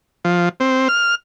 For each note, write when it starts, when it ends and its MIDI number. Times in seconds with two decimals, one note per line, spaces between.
0.25 0.49 53
0.60 0.88 60
0.89 1.15 89